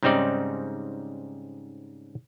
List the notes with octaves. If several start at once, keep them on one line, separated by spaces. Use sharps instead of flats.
G#2 C#3 G3 C4 D#4 D5